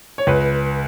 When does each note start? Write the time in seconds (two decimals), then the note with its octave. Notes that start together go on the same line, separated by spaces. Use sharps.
0.18 C#5
0.27 C#2 B4